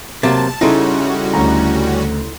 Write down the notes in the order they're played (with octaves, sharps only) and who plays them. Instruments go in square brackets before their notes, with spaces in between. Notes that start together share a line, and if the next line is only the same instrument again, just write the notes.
[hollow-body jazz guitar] C3 F#3 A#3 [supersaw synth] A5 [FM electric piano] A6
[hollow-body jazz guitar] C#3 D#4 [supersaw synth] G3 C#4 F#4 [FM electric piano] E4 A4 C6
[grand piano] D2 A#5